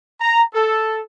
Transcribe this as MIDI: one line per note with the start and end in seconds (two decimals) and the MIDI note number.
0.21 0.42 82
0.54 0.99 69